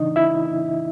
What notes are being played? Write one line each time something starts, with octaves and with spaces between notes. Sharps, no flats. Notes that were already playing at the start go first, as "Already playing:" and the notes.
Already playing: C#3 E3 D4 D#4 D#5
E4 E5